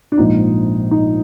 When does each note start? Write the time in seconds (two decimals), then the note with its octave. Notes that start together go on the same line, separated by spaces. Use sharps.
0.12 D4
0.18 A#1 G#2 F3 D#4
0.91 D#4